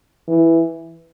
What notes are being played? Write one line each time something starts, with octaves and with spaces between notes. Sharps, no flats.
E3